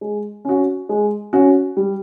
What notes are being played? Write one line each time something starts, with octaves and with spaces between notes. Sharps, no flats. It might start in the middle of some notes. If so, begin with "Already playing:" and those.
G#3
C#4 F#4
G#3
C#4 F#4
G3